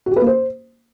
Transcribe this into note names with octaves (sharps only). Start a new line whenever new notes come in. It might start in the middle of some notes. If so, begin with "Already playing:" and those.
F#4
G4
B4
A#3
C5